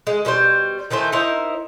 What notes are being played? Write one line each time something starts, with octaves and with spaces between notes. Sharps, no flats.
G#3
B2 G3 A#4 C5
D#3 E3 A3 C5
D#4 E4 A#4 C5